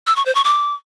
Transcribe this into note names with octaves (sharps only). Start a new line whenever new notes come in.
E6
C#6
C5
C#6
D6